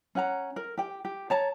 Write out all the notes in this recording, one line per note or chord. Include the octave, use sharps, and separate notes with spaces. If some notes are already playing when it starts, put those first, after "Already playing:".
C#4 F#5 A#5
A#4
G4 G5
G4
C#5 A5 A#5